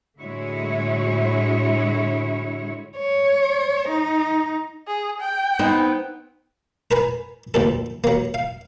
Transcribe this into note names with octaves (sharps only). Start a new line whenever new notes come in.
A2 D3 G#3 E4 F#4 C#5
C#5
D#4
G#4
G5
B3 C4 D#4
A#4 B4 G#5
D2 A#2 A4
F#3 A#3
F5